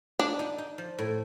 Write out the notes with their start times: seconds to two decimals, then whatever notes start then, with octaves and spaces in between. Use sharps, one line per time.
0.19 D4 D#4
0.39 D#4
0.58 D#4
0.78 F3
0.98 A2